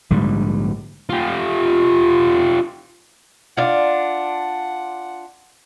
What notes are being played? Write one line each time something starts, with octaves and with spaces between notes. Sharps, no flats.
A#1 G#2 D3 G3
F4 G4
D4 F4 F#5